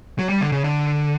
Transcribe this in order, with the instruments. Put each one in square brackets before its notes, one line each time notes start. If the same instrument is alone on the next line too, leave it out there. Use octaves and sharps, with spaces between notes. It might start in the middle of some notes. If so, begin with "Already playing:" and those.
[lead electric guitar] F#3
G3
D3
C#3
D3